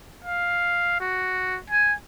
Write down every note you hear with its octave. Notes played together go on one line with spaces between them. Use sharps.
F5
F#4
G#5